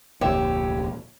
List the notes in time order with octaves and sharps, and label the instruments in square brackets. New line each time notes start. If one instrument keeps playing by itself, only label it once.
[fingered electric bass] F1 D2 A#2 [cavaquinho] G4 E5 [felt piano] C#5